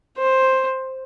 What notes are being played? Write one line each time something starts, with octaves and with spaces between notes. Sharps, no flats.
C5